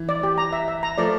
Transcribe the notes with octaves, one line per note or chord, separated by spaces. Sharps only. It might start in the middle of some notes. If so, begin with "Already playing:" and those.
Already playing: E3
D5
G4
A#5
E5
E5
A#5
F3 A3 D5